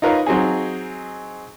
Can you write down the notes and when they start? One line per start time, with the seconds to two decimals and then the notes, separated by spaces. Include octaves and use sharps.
0.02 D#4 F4 A#4 B4 C#5 F5
0.26 F#3 C4 D#4 G#4